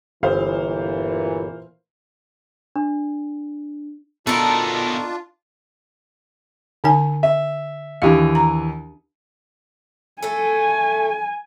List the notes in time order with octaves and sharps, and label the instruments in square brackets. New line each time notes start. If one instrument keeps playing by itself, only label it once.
[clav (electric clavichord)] G1 [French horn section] A#2 E3 [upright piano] C5 F5
[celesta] D4
[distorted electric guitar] B2 A#4 [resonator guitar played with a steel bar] B3 A5 [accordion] D4 F4 [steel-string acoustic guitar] D#4 A4
[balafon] D3 D#4 G#5
[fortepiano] E5
[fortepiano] D#2 E3 [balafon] D4 G4 F5
[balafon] A#5
[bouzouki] A3 A4 [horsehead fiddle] G#5